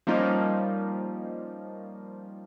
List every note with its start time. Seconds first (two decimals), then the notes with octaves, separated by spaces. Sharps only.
0.07 F3 G3 A#3 C#4 D#4 F4